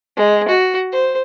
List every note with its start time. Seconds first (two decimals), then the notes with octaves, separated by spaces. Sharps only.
0.17 G#3
0.48 F#4
0.92 C5